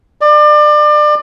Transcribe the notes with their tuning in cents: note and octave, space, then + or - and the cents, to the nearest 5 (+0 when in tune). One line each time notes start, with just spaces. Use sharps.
D5 +30